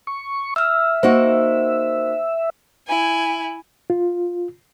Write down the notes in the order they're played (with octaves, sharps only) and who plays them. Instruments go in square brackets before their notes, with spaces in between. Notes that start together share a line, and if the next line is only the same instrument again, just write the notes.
[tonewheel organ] C#6
[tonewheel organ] E5 [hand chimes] E6 F6
[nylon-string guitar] A#3 D#4 F#4 [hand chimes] C5
[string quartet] E4 G#5
[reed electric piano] F4